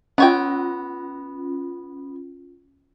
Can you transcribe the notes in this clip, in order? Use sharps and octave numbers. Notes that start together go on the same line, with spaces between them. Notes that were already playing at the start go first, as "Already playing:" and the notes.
B3 C#4 F4 C#5 G5